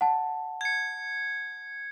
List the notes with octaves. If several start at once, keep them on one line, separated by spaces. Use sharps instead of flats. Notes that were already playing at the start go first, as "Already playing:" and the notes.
F#5 A5
G#6 C#7